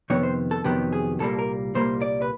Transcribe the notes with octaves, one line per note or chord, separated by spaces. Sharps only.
F2 C3 D#3 B3 C#5
C5
A4
F2 C3 D#3 F#3 B3 G4
G#4
C2 A#2 G3 A#3 A4
A#4
C2 A#2 G3 A#3 C5
D5
B4